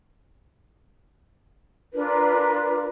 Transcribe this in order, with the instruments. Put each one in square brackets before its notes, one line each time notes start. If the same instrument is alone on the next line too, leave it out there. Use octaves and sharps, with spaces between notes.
[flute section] D4 F4 A#4 B4